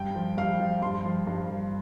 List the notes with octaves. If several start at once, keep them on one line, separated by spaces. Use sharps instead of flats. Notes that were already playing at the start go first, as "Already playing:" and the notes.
Already playing: G2 G5
F3
G2 F5
F3
G2 C6
F3
G2
F3